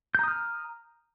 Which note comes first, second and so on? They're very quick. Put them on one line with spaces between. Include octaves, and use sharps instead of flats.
G6 A#5 D#6 F6